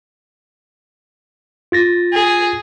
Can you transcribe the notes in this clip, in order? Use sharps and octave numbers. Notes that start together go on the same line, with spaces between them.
F4 A6 A#6
G#4